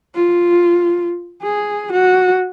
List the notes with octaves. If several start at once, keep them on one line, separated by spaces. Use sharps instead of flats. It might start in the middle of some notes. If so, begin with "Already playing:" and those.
F4
G#4
F#4